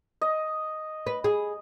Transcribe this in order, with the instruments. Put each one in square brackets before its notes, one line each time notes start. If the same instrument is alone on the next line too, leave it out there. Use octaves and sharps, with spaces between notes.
[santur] D#5
[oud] B4
G#4